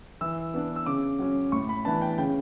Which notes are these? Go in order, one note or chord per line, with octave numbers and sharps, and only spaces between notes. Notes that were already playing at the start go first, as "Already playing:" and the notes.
E3 E6
B3 D4
E6
C#3 D6
F#3 C#4
A2 C#6
B5
E3 B3 D4 A5
G5
C#3 G5